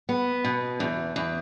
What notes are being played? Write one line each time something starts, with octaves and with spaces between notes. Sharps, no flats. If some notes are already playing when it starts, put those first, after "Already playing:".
B3
B2
E2
E2